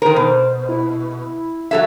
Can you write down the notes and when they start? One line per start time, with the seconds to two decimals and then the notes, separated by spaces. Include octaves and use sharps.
0.02 D#3 A#4 C5
0.16 B2
0.69 E4
1.71 F#3 A4 E5 G#6